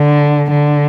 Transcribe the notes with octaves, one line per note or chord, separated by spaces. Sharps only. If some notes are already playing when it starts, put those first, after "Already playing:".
Already playing: D3
D3